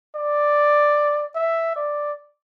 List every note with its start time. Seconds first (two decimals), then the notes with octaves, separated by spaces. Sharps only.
0.16 D5
1.35 E5
1.76 D5